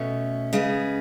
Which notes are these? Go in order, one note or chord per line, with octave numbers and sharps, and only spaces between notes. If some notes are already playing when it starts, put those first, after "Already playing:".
Already playing: B2 A3 C#4
C#3 G#3 B3